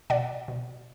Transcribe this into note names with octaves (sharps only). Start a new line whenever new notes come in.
B2 D5 F#5
B2